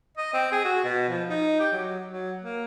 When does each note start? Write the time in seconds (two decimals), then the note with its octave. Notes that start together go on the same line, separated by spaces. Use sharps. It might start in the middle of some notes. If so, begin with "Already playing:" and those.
0.17 D#5
0.34 C4
0.52 G#4
0.65 F#4
0.84 B2
1.09 F3
1.29 D#4
1.60 G4
1.73 F#3
2.09 F#3
2.42 A#3